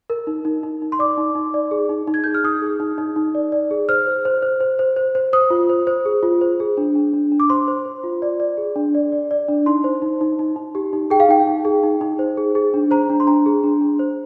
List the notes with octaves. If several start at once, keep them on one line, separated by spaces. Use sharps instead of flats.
A#4
D#4
D#4
D#4
D#4
C6
D5 D6
D#4
D#4
D5
G#4
D#4
D#4
G#6
G#4 G6
F6
D#4 D#6
G#4
D#4
D#4
D#4
D5
D5
G#4
C5 F6
C5
C5
C5
C5
C5
C5
C5
C5 D#6
F4
C5
C5
G#4
F4
C5
G#4
D4
D4
D4
D4
D6
C5 C6
C5
C5
F4
D5
D5
G#4
D4
D5
D5
D5
D4
D#4 C6
C5
D#4
D#4
D#4
D#4
G4
D#4
G#4 G5
F5
D#4 G5
D#4
G#4
D#4
D#4
C5
G#4
G#4
D4
C5 A#5
D4
C6
D4 A#5
G#4
D4
D4
C5